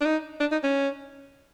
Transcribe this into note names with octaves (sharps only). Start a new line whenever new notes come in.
D4
D#4
D4
D#4
C#4